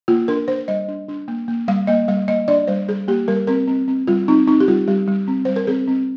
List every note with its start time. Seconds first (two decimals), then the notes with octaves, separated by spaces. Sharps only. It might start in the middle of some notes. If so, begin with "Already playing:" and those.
0.08 A#3 F4
0.28 D4 A#4
0.47 D4 C5
0.68 G3 D#5
0.88 D4
1.08 D4
1.28 A#3
1.48 A#3
1.68 G3 F5
1.87 A#3 D#5
2.08 G3 F5
2.28 A#3 D#5
2.48 D4 D5
2.67 G3 C5
2.88 G3 G#4
3.08 A#3 G4
3.28 G3 A#4
3.47 C4 A#4
3.67 C4
3.88 C4
4.07 G3 F4
4.28 C4 D#4
4.47 C4 D#4
4.60 G4
4.68 G3 F4
4.88 G3 G4
5.08 G3
5.28 C4
5.45 G3 C5
5.56 A#4
5.67 C4 G#4
5.88 C4